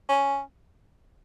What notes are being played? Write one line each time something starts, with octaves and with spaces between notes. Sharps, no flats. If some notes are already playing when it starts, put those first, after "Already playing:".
C#4